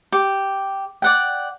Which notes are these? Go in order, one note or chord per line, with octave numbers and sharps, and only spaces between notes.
G4
D5 F#5 G5